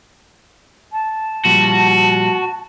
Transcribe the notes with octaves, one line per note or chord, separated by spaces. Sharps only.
A5
A#2 F3 G3 F#4